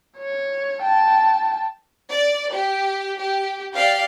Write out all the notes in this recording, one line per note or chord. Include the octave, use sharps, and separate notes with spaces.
C#5
G5 A5
D5
G4
G4
G4 D5 F5